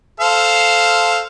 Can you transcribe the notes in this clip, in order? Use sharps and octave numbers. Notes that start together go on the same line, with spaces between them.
A4 C5 F5